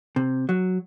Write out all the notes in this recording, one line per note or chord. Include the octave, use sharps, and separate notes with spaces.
C3
F#3